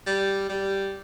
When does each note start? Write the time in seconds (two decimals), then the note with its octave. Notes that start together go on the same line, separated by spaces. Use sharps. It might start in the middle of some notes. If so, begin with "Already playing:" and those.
0.07 G3
0.49 G3